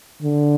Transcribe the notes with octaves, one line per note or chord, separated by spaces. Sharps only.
D3